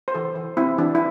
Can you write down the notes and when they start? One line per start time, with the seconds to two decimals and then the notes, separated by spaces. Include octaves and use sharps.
0.08 C5
0.14 E3 A4
0.35 E3
0.57 C4 E4
0.78 E3 D4
0.95 E4